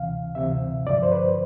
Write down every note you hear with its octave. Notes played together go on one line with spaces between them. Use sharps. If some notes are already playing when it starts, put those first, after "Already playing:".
Already playing: D2 C3 E3 F5
D2 C3 E3 E5
G2 D3 F3 D5
C5
B4